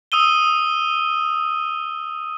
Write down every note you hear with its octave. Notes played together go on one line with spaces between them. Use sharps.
D#6 E6 D#7 G7